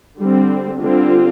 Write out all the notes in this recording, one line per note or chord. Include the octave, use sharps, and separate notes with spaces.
D3 G3 C4
D3 G3 C4 F4